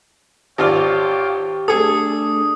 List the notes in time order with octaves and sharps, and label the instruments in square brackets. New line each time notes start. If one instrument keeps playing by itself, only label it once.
[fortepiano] G#1 F4 D5 [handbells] G4 [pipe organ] C#5 F5 G5
[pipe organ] A3 D4 [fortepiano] G#4 A4 [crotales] D#6